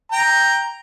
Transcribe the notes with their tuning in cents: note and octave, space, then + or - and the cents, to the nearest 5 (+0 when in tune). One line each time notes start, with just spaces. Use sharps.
G5 +5 A#5 +0